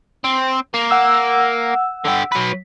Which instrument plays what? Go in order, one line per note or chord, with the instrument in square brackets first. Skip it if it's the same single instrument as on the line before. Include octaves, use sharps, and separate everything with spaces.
[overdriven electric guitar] C4
A#3
[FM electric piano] F#5 E6
[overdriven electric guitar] D3 G4
F#3 B4